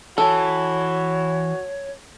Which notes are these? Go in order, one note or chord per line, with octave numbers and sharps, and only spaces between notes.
E3 F#4 A4 C#5